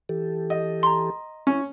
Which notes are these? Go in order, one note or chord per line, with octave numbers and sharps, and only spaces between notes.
E3 G4 A4
D#5
A#5 C6
C#4 E4